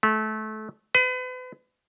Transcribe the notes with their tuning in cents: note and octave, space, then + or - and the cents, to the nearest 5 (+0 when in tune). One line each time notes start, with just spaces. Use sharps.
A3 -25
B4 +40